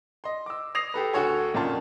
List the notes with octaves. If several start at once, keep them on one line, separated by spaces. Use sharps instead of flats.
D#5 C6
D6 E6
D#6 A#6 C7 F7
G4 A4 B4
D2 F#4 A4 C#5 G#5
F2 A#2 D#3 C#4 F4 A5